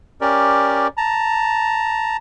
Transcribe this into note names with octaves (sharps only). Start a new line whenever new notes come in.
C#4 G4 A#4 D5
A5 A#5